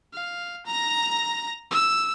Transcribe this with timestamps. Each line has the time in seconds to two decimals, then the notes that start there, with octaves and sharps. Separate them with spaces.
0.14 F5
0.66 A#5 A#6
1.71 E6